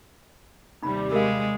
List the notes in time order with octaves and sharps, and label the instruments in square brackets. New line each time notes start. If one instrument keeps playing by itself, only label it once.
[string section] D#2 C3 G3 [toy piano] D#4 B5
[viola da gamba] G#3 [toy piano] A#4 F5